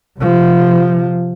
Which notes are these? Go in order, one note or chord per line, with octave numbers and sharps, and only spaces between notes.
C3 F3